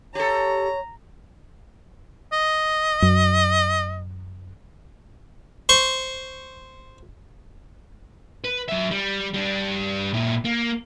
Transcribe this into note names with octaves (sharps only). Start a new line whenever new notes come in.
G4 A4 C#5 A#5
D#5
F#2
C5 C#6
B4
F#3 E5
G3
G3 D4
A#2 E4
A#3